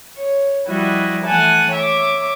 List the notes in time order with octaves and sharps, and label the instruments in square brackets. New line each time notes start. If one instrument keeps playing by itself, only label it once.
[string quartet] C#5
F3 G3 E4 F#4 D#5
E3 A3 F#5 G#5 A5
C#5 E5 D6